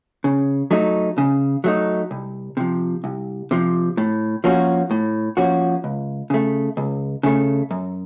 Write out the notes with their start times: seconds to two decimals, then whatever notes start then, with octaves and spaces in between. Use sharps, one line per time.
0.24 C#3
0.71 F#3 A3 D#4
1.18 C#3
1.64 F#3 A3 D#4
2.11 C2
2.57 C3 F3
3.04 C2
3.51 C3 F3
3.97 A2
4.44 F3 A#3 C#4 F#4
4.91 A2
5.37 F3 A#3 C#4 F#4
5.84 C#2
6.30 C#3 A3
6.77 C#2
7.23 C#3 A3
7.71 F#2